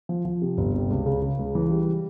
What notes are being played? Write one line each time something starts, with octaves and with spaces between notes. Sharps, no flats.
F3
F3
C3
G1
C3
C#2
C#3
C#3
C#2
E3
G3